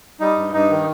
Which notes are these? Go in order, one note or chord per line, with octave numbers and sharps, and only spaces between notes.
G3 D#4
G2
G2 D#4
D#3